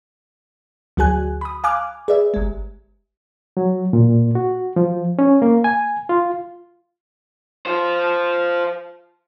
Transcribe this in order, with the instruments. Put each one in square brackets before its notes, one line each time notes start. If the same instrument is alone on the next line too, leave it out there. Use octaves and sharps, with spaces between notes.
[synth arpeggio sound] D2 F#3 F#4 G#4 G#5 F#6
B5 D#6
F5 G#5 D6 F6 F#6
G#4 B4 D5 E5
G1 G#3
[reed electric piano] F#3
A#2
F#4
F3
C#4
A#3
G#5
F4
[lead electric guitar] F4 C5